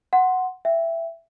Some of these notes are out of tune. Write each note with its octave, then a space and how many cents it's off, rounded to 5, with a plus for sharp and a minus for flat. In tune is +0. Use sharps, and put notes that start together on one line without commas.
F#5 +0 C6 +0
E5 +15 G5 +0